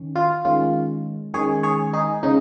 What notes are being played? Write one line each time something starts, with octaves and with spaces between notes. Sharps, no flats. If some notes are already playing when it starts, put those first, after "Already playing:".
Already playing: D#3 C#4
F4
D#3 G#3 C#4 F4
D#3 G#3 C#4 G#4 C#5
G#4 C#5
D#4 G#4
C#3 G#3 C#4 D#4